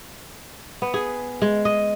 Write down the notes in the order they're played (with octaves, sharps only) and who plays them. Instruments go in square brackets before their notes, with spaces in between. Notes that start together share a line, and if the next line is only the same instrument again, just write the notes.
[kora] B3
G#4
G#3
D#5